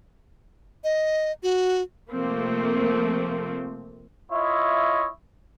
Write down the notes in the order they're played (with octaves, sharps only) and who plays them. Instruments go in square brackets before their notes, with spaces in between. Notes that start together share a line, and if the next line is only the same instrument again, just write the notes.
[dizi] D#5
F#4
[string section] C3 F3 A3 A#3 C4
[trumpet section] E4 F4 C#5 D#5 E5